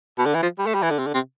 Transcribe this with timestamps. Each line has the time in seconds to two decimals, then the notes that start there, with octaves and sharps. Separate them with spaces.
0.19 B2
0.26 D3
0.34 E3
0.42 F3
0.59 G3
0.67 A3
0.75 G3
0.82 E3
0.91 D3
0.99 C3
1.07 D3
1.14 C3